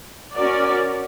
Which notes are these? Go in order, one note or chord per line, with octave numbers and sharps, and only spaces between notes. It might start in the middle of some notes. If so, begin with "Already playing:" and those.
C#4 F#4 A#4 D5